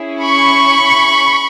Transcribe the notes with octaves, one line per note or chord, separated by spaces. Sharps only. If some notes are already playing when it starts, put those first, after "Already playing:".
Already playing: C#4 E4 G#4
B5 C#6